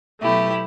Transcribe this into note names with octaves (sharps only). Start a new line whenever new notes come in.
B2 F#3 A3 E4 G4